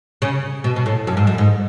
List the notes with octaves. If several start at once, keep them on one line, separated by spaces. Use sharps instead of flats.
C#3
B2
B2
A2
F#2
G#2
F#2
G#2